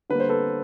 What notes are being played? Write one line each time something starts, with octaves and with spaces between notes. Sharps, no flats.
D3 G3 A#3 B4
C5
A4 B4